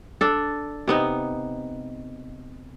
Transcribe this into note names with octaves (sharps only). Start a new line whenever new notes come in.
D4 A4
C3 B3 D#4